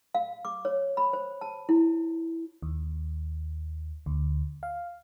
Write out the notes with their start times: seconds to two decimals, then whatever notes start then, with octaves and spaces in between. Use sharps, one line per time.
0.15 F5
0.45 D6
0.65 C#5
0.97 B5
1.13 C5
1.41 A5
1.69 E4
2.62 D#2
4.06 D2
4.63 F5